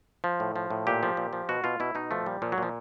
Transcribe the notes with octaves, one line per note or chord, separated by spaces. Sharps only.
F3
A2
F3
A2
A#2 G4
F3
A#2
F3
B2 F#4
B2 F4
B2 E4
B2 D#4
F3 A3
A#2 G3
A#2 F3
F#3
A#2 F3